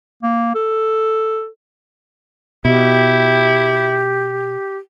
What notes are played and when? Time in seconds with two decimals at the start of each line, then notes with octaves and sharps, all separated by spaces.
0.23 A#3
0.55 A4
2.65 B2 E4 G4